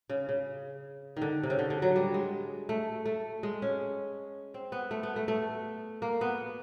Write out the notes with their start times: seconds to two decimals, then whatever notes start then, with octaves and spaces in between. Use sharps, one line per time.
0.09 C#3
0.29 C#3
1.17 D#3
1.22 D3
1.43 C3
1.50 C#3
1.59 D3
1.70 D3
1.82 F#3
1.96 G3
2.14 G#3
2.69 A3
3.06 A3
3.43 G#3
3.62 C#4
4.54 C4
4.72 B3
4.91 A3
5.03 B3
5.16 A3
5.28 A3
6.02 A#3
6.21 B3